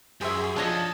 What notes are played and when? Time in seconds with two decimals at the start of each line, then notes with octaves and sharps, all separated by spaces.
0.21 F#2 G4 G#4 C5 E5
0.56 F3 D4 C#5 D#5 A5